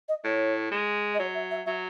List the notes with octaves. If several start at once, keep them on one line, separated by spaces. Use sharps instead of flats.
D#5
A2 C#5
G#3
D#5
F#3 C#5
E5
E5
F#3 E5